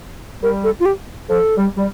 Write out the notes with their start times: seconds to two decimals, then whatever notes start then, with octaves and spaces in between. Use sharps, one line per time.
0.43 G3 A#4
0.64 A4
0.80 F4
0.85 G4
1.29 F3 A4
1.57 G3
1.77 G3